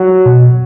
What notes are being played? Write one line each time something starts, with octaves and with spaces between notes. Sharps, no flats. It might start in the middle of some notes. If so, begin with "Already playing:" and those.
Already playing: F#3
B2